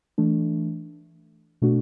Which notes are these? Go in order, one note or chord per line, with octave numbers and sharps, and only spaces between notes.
E3 A3 D4
B2 A3 D4 F#4